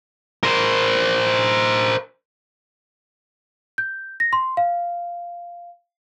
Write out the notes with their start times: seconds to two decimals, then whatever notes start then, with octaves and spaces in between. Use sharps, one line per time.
0.43 A#4 C5
3.78 G6
4.20 A#6
4.33 C6
4.57 F5